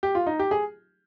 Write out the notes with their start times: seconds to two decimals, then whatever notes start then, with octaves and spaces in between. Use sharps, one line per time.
0.03 G4
0.15 F4
0.26 D#4
0.39 G4
0.51 G#4